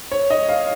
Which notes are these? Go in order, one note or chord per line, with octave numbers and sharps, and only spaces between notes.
C#5
D#5
F5